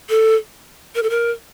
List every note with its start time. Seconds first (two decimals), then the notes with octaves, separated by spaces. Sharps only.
0.09 A4
0.95 A#4
1.03 A4
1.10 A#4